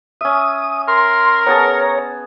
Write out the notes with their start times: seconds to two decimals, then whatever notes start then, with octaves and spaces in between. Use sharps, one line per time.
0.21 C#4 E5 D#6
0.88 A#4 C6
1.46 B3 G#4 C#5 A5 A#5